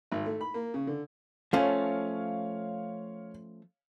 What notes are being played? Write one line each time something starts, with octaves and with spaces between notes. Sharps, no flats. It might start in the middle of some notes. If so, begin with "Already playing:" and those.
G#1
A3
B5
A#3
C#3
D3
F3 A3 C#4 C#5 F5